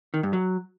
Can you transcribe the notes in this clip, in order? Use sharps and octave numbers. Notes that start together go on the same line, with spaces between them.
D#3
G2
F#3